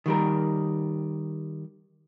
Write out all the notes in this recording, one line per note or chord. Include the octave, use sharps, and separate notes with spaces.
D#3 G3 A#4